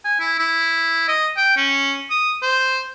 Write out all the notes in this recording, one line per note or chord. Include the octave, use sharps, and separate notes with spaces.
G#5
E4
E4
D#5
G5
C#4
D#6
C5